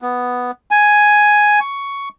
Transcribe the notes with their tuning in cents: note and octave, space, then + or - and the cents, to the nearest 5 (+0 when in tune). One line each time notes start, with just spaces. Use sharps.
B3 +0
G#5 +5
C#6 +10